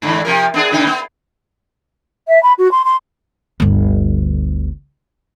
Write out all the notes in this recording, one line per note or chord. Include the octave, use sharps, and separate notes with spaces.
G#2 D3 E3
C3 F3 A#4
B3 D4 G#4
A#2 C#3 D#4
B3
E5
B5
F#4
C6
C6
G1 D2